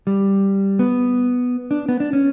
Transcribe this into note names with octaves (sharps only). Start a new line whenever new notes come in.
G3
B3
D4
B3
D4
C#4